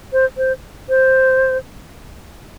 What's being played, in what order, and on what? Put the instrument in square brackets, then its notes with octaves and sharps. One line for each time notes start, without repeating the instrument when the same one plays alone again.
[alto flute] C5
C5
C5